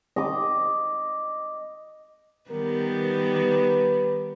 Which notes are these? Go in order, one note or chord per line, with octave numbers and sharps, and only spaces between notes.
D#5 D6
D#3 G3 B3 A#4
B4